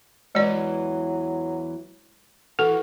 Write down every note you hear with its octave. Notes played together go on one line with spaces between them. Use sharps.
E2 E3 F#3 G#3 D5
E3 F#4 A4